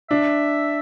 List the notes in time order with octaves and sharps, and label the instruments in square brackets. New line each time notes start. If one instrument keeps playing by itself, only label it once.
[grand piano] D4 [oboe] E5